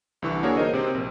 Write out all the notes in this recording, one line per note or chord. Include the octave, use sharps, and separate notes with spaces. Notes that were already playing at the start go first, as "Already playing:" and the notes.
C2 D3 E3 C#6 E6
A#3 D4 F#4 G#4 A#4 C#5
D#4 A#4 C5 D#5
C3 C4 C5
A#1